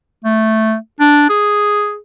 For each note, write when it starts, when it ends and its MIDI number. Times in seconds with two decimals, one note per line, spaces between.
0.24 0.75 57
1.00 1.25 62
1.30 1.97 68